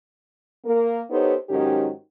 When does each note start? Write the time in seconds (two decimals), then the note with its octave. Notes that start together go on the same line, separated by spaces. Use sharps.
0.65 A#3 A#4
1.10 B3 D#4 G4 A4 C5 C#5
1.49 G#2 D#3 F#3 C#4 D#4 G4